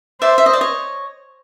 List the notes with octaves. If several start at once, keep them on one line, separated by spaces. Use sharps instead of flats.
C5 D5 E5
E5
D#5
D5
C#5 D#5